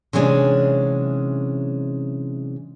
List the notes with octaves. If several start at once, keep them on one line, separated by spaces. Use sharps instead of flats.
C3 E3 F#3 G#3 C#4 D4